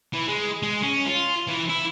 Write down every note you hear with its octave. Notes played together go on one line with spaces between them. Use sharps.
E3
G#3
G#3
C#4
F4
E3
E4